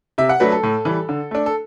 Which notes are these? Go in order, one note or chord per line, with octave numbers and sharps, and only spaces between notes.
C3 E5
F#5
F#3 A3 D4 B4
A4
A2
E3 G3
D3
A3 D4
A4